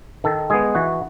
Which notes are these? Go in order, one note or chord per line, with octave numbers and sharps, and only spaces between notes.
D#3 A4
G#3 B3 G#4
E3 F#4